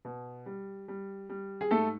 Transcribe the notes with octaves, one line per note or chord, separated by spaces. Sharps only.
B2
G3
G3
G3
G#4
G#2 A3 A4